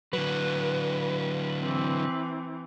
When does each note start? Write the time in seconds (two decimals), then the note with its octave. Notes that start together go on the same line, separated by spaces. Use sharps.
0.13 D3 F#3 B4
1.63 E3 C4